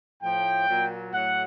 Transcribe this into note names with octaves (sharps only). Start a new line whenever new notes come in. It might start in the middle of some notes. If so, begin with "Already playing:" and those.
A2 F3 G5
A#2 F#3
A2 F#3 F#5